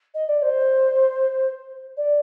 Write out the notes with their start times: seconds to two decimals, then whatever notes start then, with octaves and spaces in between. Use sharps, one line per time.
0.14 D#5
0.28 D5
0.42 C5
1.96 D5